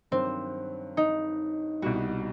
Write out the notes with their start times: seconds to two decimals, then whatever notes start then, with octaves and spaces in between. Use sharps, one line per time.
0.12 G2 D#3 F#3 C4
0.97 D#4
1.82 C2 B2 G3 F#4